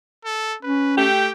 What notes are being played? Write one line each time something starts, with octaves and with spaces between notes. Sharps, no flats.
A4
C#4 B4
A3 G4 G5